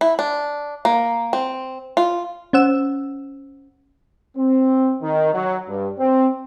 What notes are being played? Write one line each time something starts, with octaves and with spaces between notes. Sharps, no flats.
E4
D4
A#3
C4
F4
C#4 C5 F#5 E6 E7
C4
D#3
F#3
G2
C4